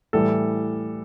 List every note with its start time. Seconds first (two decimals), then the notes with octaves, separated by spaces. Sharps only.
0.13 A2 E3 G3 A4